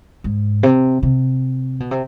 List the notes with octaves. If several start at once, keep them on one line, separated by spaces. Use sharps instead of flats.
G#2
C3
C3
B2
C3